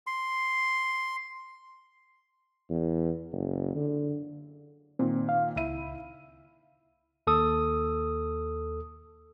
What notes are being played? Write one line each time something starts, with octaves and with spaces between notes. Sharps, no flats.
C6
E2
F#1
D3
A#2 D#3 C4
F5
C#2 E4 E5 D#7
D#2 A4 D#6